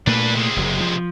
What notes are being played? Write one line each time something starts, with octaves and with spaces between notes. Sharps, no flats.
A#2 A3 D4 B4
C3 G#3
F#1 F#3
F3